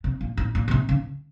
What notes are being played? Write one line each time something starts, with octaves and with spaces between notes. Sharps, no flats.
C3
A#2
A2
A#2
A#2
C3
C#3